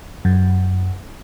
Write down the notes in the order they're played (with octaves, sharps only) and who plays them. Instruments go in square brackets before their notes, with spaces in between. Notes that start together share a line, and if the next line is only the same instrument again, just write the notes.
[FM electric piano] F#2